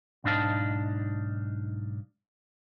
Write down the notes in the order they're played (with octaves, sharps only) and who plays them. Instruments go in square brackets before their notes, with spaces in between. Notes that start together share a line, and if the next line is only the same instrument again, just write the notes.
[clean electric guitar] B1 G#2 D4 D#4 F5 A5